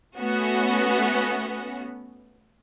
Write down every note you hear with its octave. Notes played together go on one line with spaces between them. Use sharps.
A3 B3 C#4 F#4